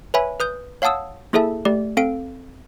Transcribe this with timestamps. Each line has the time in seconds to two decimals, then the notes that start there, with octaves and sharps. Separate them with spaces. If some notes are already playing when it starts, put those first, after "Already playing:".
0.14 B4 C#5 E5 G#5 B5
0.40 B4 D#6 G6
0.82 C#5 F5 F#5 A5 D#6 E6
1.33 A#3 E4 G#4 A4 E5 A5
1.65 A3 G4 D5
1.97 C4 A4 F5 D7